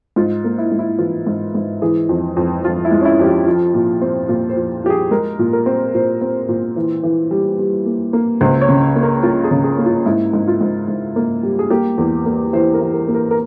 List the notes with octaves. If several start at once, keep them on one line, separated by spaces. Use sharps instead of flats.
G#2 F4
A#3
E4
G#2
E4
E3 F4
G#2
G#2
E3 G#4
F2
F2
F2 F4
E4
G#3
C#4
E4
F2 G4
F4
F3
A#2
C4
A#2 F4
C5
F3
F3 G4
G#4
G#3 A#4
A#2
A#4
C4
A#2 C5
C4
A#2
E3
E3
G3
G3
A#3
A#3
C#2 C5
C#5
C#3
A#3
A#4
A#3 F4
G#4
C#3
G#4
A#3
F4
G#2 E4
G#2
F4
G#2
G#2
A#3
G3
G#4
A#3 G4
E2
A#3
E3 C5
A#4
E3
A#4
A#3
A#4
A#4